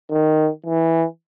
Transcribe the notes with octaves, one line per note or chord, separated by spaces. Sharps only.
D#3
E3